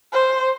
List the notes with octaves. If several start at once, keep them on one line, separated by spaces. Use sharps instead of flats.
C5